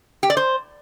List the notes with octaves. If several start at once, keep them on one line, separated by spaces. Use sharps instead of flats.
G4
D5
C5